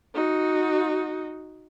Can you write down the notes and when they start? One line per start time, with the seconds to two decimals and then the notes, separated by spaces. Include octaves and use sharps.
0.14 D#4 F#4